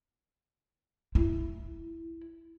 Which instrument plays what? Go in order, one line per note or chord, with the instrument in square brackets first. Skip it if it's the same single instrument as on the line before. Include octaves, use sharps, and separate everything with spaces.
[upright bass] E4